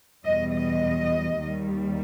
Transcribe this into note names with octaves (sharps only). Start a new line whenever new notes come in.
E2 B2 G3 D#5
D#5
D#2 D#3 G3